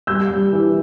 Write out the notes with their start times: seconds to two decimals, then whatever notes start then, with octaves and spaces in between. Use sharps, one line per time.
0.07 G3 E6 G6
0.30 G3
0.53 E3